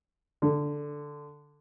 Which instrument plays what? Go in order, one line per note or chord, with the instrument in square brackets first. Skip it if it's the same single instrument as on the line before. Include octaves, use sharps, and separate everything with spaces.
[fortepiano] D3